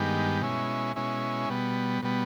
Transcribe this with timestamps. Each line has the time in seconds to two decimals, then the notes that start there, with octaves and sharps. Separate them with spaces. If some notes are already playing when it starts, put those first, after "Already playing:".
Already playing: G2 D#3 G#3 B3 G4
0.42 B2 G#3 C#4 E4
0.96 B2 G#3 C#4 E4
1.49 B2 G3 B3
2.02 B2 G3 B3